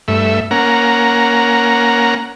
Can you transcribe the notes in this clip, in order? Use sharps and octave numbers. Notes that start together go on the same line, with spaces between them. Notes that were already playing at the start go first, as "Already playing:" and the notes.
G2 A3 E5
A#3 C#4 F#5 A#5